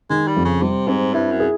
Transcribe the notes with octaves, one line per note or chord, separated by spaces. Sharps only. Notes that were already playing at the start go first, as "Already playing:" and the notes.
D#3 G#3
G3
F2
C#3
C3 G3
G#2 C4
G2 E4
F#2
G#4